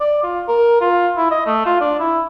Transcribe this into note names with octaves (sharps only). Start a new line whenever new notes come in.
D5
F4
A#4
F4
E4
D#5
A3
F4
D4
E4